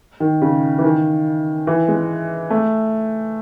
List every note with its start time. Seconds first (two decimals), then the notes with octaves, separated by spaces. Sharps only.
0.20 D#3
0.42 C#3
0.78 E3
0.84 D#3
1.67 E3
1.88 G#3
2.50 A3